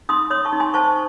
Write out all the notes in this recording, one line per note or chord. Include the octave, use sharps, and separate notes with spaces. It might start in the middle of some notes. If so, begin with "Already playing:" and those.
D#4 C6 D#6
C#5 C6 D#6
A5 C#6
D#4
G#5 C6
C5 A5 C#6